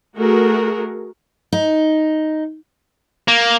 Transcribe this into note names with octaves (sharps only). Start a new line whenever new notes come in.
A3 F#4 G#4 A#4
D#4
A#3